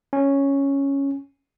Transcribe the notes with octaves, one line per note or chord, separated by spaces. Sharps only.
C#4